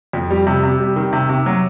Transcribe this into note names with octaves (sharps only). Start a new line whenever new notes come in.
F2
G3
C3
C3
G3
D#3
C3
C3
F#3